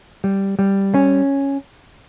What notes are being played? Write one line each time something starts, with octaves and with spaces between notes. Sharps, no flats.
G3
G3
C#4